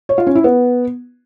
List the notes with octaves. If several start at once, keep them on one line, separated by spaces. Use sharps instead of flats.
C#5
F4
C#4
E4
B3